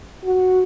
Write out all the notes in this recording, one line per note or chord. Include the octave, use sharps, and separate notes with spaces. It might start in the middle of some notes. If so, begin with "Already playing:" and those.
F#4